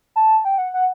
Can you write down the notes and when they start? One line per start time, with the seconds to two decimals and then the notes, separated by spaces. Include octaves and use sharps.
0.16 A5
0.45 G5
0.58 F#5
0.74 F#5